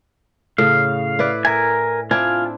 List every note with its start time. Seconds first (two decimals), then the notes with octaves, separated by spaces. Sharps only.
0.58 A2 C#3 F5
1.19 E4 B4 D5
1.45 A#4 E5 G#5
2.11 C4 D4 E4 F4 G#5